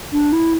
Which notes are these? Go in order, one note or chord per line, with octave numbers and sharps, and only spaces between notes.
D4
E4